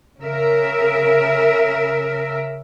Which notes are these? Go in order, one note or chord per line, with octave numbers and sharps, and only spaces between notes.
C#3 A#4 E5